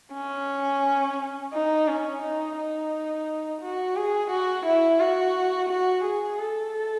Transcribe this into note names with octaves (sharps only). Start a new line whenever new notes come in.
C#4
D#4
C#4
D#4
D#4
F#4
G#4
F#4
E4
F#4
F#4
G#4
A4